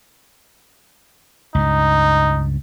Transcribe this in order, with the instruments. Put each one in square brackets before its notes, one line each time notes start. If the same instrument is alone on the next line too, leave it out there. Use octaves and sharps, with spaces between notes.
[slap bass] C#2 G2 [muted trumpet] D#4